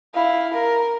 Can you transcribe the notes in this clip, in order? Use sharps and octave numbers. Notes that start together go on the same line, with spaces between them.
E4 F5
A#4